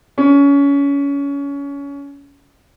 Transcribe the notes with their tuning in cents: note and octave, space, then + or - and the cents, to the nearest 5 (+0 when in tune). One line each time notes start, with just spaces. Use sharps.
C#4 +25